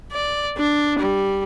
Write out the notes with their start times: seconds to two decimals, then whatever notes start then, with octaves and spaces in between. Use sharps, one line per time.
0.12 D5
0.57 D4
0.99 G3